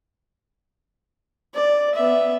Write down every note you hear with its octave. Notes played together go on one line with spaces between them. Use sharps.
D5
B3 E5